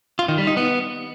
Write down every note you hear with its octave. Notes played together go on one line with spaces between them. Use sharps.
F4
D#3
G3
D#4
B3